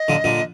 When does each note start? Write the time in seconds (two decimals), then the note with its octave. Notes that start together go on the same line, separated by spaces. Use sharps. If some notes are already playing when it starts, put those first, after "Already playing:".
Already playing: D#5
0.08 A#2 D3
0.24 A#2 D3